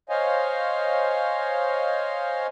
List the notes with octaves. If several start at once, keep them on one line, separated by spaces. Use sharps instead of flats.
C5 C#5 D#5 F5 G#5